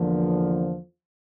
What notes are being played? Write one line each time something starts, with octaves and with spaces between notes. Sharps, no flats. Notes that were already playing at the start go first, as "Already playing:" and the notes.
Already playing: E2 D3 F3 A#3